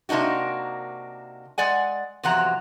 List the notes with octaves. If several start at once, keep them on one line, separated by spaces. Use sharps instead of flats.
C3 A#3 D4 D#4 F#4
G#3 D5 F#5 G#5
E2 C3 F3 F#3 F#5 A#5